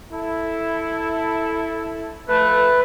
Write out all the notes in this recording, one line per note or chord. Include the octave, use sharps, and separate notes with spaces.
E4 A4
F3 A3 B4